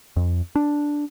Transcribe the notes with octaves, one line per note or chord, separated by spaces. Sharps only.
F2
D4